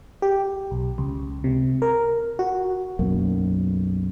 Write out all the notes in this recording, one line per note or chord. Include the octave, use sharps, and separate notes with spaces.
G4
B1
C#2
C3
A#4
F#4
B1 F#2 A#3